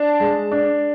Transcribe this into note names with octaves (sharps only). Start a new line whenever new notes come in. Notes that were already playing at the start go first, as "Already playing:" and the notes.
Already playing: D4 A5
G#3
D4